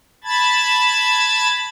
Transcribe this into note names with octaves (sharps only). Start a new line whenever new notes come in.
A5 B5 G#6 A6